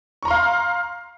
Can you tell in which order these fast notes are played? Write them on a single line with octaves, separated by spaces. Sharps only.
C#6 A#5 C6 F5